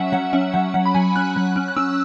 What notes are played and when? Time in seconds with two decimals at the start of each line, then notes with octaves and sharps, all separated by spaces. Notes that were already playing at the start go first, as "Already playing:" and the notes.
Already playing: F#3 C#4 E5 F#5
0.12 F#3 F#5
0.33 C#4 E5
0.54 F#3 F#5
0.74 F#3 F#5
0.86 B5
0.94 F#3 G#5
1.16 C#4 F#6
1.36 F#3
1.56 C#4
1.68 F#6
1.76 C#4 E6